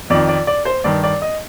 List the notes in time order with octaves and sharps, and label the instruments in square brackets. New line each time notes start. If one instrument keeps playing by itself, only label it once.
[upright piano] F2 D#3 D5
D5
D5
C5
G2 D#3 D5
D5
D#5